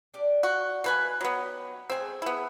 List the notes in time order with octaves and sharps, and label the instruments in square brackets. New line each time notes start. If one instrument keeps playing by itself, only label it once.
[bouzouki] D4 G4 D5
[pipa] F#4 [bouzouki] G5
[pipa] B2 B4 G#5 [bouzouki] A#3 D#4
[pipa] F#3 B3 [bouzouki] D#4 G4
[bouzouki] G#3 A3 G#4 [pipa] C4 G#5
[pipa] B3 E4